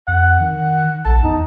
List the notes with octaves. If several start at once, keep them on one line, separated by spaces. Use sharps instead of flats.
F2 F#5
D#3
A#1 A5
E2 D#4